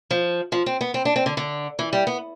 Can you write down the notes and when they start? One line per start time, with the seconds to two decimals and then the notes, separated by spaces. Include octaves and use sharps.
0.11 F3
0.52 F3
0.66 C4
0.81 B3
0.94 C4
1.05 D4
1.16 C4
1.26 D3
1.37 D3
1.79 E3
1.93 G3
2.07 B3